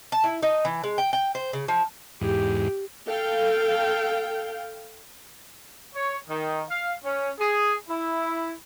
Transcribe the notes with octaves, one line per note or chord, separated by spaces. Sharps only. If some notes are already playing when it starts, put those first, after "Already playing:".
A5
E4
D#4
E3
G#3
G5
G5
C5
C#3
F3
E2 G#2 G4
A4 F5 G5
C#5
D#3
F5
C#4
G#4
E4